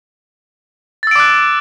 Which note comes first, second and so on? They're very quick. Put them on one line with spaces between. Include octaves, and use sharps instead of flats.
A6 E6 D7 D6 F#6